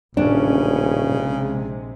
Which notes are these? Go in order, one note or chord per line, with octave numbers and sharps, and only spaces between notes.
D#1 A1 A2 C#3 C#4 D4
A#1 C3 G#3